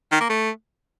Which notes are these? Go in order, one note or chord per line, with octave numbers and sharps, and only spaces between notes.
D#3
A#3
A3